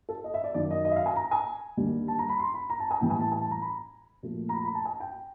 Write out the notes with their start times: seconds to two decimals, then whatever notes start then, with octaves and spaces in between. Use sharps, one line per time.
0.09 A4
0.24 D#5
0.34 E5
0.44 D5
0.54 F#2 D#3 F#3 D5
0.71 D#5
0.85 D#5
0.91 E5
0.96 F5
1.06 G#5
1.16 A#5
1.31 G#5
1.77 D#2 D3 G3
2.08 A5
2.19 A#5
2.29 B5
2.39 C6
2.54 B5
2.70 A#5
2.80 A5
2.91 G#5
3.01 A2 E3 G3 G5
3.10 G#5
3.20 A5
3.32 G#5
3.41 A5
3.51 A#5
3.61 B5
4.23 A#2 F3 A3
4.49 A#5
4.54 B5
4.64 B5
4.75 A5
4.85 G#5
5.00 G5